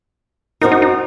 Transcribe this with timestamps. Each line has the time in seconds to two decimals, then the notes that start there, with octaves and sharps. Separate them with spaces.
0.61 F#2 F#3 C4 D#4 F#4 A#4
0.72 D#4
0.82 D#4